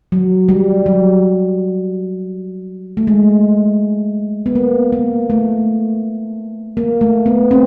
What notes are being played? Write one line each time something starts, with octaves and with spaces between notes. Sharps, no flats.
F#3
G3
F#3
A3
G#3
B3
A#3
A#3
A3
A#3
A3
B3
C4